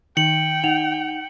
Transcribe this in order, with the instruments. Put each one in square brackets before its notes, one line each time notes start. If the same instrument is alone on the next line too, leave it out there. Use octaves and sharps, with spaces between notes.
[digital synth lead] D#3 [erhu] G5 [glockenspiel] C#7 F#7
[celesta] D#4 F#5 F7